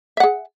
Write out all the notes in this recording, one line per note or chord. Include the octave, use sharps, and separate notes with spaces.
G#4 E5 F#5